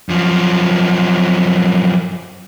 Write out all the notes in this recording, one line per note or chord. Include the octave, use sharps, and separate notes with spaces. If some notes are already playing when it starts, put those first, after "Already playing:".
F#2 F3